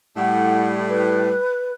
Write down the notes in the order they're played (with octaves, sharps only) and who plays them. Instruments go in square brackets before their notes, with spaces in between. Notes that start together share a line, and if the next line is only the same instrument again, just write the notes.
[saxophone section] A2 G3 [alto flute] F#5
[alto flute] B4